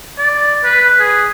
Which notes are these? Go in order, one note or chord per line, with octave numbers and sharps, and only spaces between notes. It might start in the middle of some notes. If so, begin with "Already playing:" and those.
D5
B4
G#4